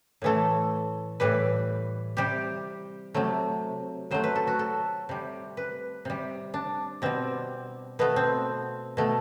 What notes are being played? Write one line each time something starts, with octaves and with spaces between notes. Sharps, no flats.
A2 E3 A3 A4
A2 E3 G3 B4
C3 G3 G4
C3 F#3 A3
C3 F#3 A3 C5
B4
A4
F#4
A4
C3 G3
B4
C3 G3
D4
B2 G3 C4
B2 A3 B3
C4
B2 A3